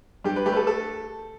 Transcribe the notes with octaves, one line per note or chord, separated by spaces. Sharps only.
G2 G4
B4
A3 G4
B4
A4
A4